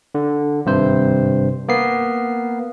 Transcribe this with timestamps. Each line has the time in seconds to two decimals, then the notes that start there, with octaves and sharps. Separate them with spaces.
0.15 D3
0.65 G#1 G2 C3 C5
1.69 A#3 B3 C7